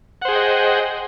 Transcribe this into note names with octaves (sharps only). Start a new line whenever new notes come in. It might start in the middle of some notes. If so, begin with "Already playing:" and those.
G#4 C5 D#5 F#5 G5